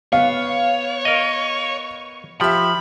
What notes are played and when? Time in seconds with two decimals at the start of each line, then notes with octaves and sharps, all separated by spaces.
0.13 B3 C#5 F5
1.05 A#4 D#5
2.41 F3 G4 E5 B5